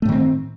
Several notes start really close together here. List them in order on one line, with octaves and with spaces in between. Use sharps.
A3 A2 D#3 C4